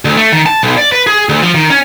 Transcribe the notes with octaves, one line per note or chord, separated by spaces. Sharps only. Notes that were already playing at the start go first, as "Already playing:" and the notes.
D2
A3
D#3
A5
B1
D5
B4
G#4
D2
F3
D#3
C#4